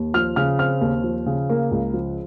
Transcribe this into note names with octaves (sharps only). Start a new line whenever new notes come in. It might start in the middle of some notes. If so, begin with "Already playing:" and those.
Already playing: D#2
F3 F6
C#3 F6
C4 F6
D#2
F3
C#3
A#3
C#2
F3